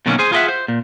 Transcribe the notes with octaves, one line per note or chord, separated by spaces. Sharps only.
B2 D#3 F#3 G3 A#3 C#4
G#4 C5 G#5
F4 G#4 A#4 D#5 E5 F#5
C5
A#2